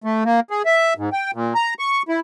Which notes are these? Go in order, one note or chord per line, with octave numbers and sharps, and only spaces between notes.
A3
A#3
G#4
E5
G#2
G5
A#2
A#5
C#6
E4